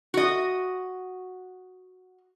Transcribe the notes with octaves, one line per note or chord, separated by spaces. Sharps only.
F#4 D#5